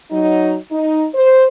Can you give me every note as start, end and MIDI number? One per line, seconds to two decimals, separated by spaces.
0.11 0.56 54
0.11 0.56 63
0.71 1.06 63
1.14 1.46 72